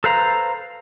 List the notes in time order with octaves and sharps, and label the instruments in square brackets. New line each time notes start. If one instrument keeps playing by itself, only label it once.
[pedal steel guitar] A4 B4 C5 F5 A#5